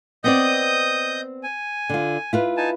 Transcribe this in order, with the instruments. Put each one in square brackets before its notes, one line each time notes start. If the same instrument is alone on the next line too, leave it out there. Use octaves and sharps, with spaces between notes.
[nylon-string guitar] B3 C4 D5 [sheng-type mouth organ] D#5 D#6 G6
[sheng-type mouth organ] G#5
[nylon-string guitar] D3 F4
E4 F4 B4
[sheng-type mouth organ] D#4 G#5 A5